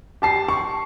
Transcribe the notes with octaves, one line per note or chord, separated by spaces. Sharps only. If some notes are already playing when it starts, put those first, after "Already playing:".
G4 A5 C7
C#6